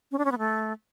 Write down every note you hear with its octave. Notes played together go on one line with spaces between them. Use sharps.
C#4
D4
C#4
B3
A3